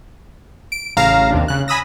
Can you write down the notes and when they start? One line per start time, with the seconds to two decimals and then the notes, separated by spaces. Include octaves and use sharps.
0.72 D7
0.97 A1 C#3 F5 A#5 E7
1.31 D#2 C3 D4
1.48 C#3 F#6
1.68 G#5 B5 D#6 E6 A#6